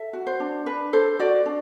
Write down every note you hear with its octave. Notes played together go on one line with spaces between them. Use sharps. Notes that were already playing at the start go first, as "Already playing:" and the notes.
Already playing: A4 E5
F#4
C5
D4
D4 B4
A4 C5
F#4 D5
D4